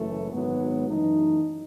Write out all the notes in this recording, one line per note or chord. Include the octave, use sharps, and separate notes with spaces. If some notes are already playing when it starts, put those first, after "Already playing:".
Already playing: F#1 F#2 E3 A3
G#1 G#2 F#3 B3
F#2 E3 A3 D#4